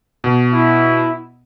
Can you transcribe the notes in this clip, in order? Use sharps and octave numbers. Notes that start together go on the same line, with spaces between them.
B2
E4